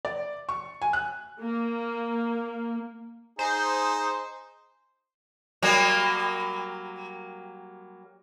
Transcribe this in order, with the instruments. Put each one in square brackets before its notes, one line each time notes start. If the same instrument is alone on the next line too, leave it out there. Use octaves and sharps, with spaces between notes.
[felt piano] D5
C#6
G#5
F#6
[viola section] A#3
[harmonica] D#4 G#4 [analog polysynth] C5
[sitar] F#3 G3 A#3